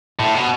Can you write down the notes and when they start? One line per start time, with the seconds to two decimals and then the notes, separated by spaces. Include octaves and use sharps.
0.19 A2
0.34 B2